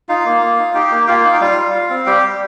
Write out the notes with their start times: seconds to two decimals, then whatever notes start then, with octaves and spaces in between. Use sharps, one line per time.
0.09 D#4 F4 F5
0.25 A#3
0.42 A#3
0.59 D#4
0.74 D#4 G4 G5
0.91 A#3
1.07 A#3 F4 F5
1.24 D#4
1.33 G5
1.40 G3 F4 F5
1.58 G3
1.74 F4
1.90 C4
2.06 G3 G4 G5
2.23 G3